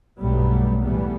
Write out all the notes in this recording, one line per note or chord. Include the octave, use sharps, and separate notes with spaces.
B1 G2 F#3 G3 A3 B3
E2 A2 E3 G3 A3 B3